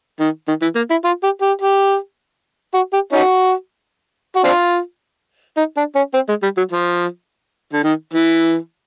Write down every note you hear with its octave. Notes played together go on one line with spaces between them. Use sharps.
D#3
D#3
E3
A#3
E4
F4
G4
G4
G4
F#4
G4
C#4 D#4 F#4
F#4
C4 D4 F4
D#4
D4
C#4
C4
G#3
G3
F#3
F3
D3
D#3
E3